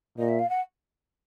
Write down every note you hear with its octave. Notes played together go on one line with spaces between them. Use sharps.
A#2 D#5
E5
F5
F#5